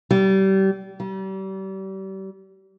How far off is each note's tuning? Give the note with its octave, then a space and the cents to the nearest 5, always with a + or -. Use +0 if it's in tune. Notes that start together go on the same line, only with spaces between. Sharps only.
G3 -30
G3 -35